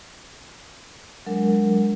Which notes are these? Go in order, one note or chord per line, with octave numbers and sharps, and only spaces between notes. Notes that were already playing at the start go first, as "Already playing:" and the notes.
F#3 G#3 D4 A#4